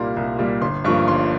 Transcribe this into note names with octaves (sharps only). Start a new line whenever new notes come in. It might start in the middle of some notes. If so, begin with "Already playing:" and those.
Already playing: C2 A#2 G3 A#3 A#5 C6
C2
A#2 G3 A#3
G1 C6
G2 F3 A#3 C#6
G1 C6